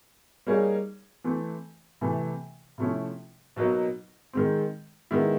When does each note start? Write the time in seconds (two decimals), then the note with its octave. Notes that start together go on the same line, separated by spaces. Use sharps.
0.47 G3 A#3 D#4 G#4 C#5
1.24 E3 A3 C4
2.01 C3 E3 A3
2.78 C3 F3 A3 C#4 E4
3.56 B2 F#3 A#3 D#4
4.33 D#3 G#3 C4
5.11 D#3 G#3 B3 E4